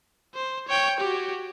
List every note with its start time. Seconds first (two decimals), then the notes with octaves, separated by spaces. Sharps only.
0.35 C5
0.68 C#5 G5
1.00 F#4 G4